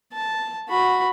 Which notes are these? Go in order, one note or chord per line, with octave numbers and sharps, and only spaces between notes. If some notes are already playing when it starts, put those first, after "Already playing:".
A5
F#4 B5